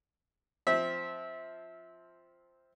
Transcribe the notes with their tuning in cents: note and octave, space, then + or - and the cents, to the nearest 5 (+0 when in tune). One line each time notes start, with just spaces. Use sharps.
F3 +0 C4 +0 E5 -20